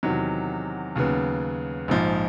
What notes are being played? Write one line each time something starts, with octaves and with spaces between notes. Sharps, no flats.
E2 C3 D#3 F#3
D#2 C#3 F#3 B3
A#1 G#2 F3